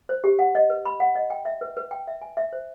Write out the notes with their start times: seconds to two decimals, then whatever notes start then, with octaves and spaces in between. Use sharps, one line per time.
0.09 C5
0.24 G4
0.39 F#5
0.55 D#5
0.70 B4
0.85 B5
1.00 F#5
1.15 D#5
1.30 G5
1.45 E5
1.61 B4
1.77 B4
1.91 G5
2.07 E5
2.22 G#5
2.37 E5
2.53 C5